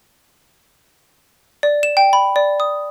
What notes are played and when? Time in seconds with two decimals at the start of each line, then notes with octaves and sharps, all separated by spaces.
1.63 D5
1.83 E7
1.97 G5
2.13 B5
2.36 D5
2.60 D#6